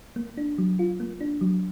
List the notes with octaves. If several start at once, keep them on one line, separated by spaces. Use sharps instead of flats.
A#3
D4
F#3
F4
A#3
D4
F#3